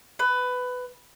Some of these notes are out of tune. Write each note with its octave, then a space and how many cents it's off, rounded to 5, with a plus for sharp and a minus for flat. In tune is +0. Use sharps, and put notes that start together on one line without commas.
B4 +15